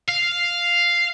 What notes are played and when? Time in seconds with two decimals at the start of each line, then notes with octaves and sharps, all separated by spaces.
0.09 F5